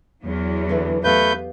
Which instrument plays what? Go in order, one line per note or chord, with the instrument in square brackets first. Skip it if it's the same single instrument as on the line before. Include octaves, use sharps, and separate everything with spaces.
[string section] E2 F#3
[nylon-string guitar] D3 E3 B4
[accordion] A3 B4 G6 [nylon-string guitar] B3 G4 F5